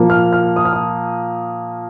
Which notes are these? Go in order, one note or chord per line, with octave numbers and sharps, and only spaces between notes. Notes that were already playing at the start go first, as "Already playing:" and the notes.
Already playing: A#2 F3 A#3
F6
F6
D#6
F6
D#6